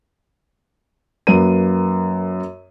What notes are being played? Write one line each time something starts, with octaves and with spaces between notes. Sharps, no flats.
F#2 A#3 B4 D#7